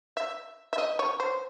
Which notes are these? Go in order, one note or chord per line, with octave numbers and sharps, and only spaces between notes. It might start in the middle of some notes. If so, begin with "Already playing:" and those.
E5
E5
D#5
C#5
C5